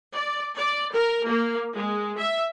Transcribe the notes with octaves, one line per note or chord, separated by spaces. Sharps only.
D5
D5
A#4
A#3
G#3
E5